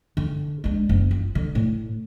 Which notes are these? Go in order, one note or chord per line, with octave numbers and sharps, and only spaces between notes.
D3
G#3 D4
F#1
F4
D3
A2